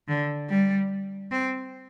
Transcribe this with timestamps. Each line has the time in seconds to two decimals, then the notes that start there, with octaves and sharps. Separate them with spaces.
0.08 D3
0.49 G3
1.31 C4